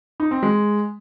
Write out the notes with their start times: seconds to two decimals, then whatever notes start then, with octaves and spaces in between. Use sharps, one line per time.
0.20 D#4
0.31 C4
0.43 G#3